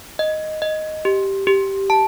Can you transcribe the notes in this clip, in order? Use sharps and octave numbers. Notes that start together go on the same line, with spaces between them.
D#5
D#5
G4
G4
A5